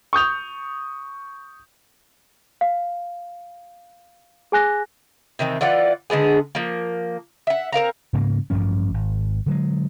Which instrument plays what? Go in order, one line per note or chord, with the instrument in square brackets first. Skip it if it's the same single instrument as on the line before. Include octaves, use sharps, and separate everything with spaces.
[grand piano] C#6 D#6 G6 F7
[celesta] F5
G#4 G#5 F#6 A#6
[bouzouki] C3 D#3 E3 C4
E3 F4 D5 F#5
D3 G#3 B3 G#4
F3 A#3
E5 F#5
C4 A#4 F5 A#5
[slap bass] G#2 C#3 A#3
A1 G2 F3 C#4
G#1
D3 F#3 G#3